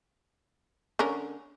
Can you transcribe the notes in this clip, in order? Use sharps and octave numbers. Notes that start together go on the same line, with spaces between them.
D3 C#4 A#4